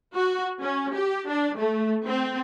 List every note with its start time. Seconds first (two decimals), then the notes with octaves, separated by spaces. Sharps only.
0.14 F#4
0.61 C#4
0.93 G4
1.27 D4
1.56 A3
2.07 C4